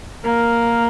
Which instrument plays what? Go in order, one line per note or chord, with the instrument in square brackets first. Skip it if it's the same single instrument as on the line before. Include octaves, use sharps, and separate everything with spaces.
[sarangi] A#3 [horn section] A#4